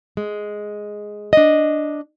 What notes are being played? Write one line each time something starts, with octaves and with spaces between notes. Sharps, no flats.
G#3
D4 D#5